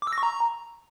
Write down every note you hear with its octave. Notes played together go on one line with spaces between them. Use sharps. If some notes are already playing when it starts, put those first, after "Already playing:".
D6
E6
A#6
C#6
A#5